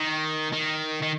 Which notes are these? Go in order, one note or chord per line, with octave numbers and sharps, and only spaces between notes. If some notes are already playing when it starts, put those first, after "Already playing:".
Already playing: D#3
D#3
D#3